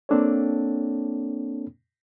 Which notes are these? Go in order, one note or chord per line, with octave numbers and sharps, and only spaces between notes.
A#3 C4 D4 A4 C#5